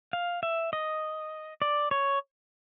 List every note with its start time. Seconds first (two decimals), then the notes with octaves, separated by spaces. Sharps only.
0.13 F5
0.43 E5
0.73 D#5
1.62 D5
1.91 C#5